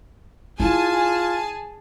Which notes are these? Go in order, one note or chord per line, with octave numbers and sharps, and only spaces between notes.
E4 F4 G#4 G#5 A5